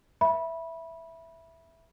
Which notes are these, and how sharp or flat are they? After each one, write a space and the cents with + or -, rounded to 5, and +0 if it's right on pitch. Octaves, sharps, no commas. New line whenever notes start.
E5 +0 B5 -20